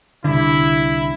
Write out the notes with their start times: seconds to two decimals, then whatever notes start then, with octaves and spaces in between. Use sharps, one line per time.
0.24 C2 D3 E4